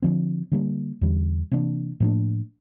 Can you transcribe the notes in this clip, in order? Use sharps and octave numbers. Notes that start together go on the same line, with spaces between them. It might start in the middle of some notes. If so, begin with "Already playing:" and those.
D3 F3 C4
D3 G3 A#3
E2 D3 G3
C3 E3 A#3 D4
A2 F3 A#3 D4